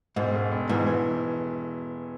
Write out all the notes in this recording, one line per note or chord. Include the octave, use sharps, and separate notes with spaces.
E1 G#2
E1
E1
G#2 E3
E3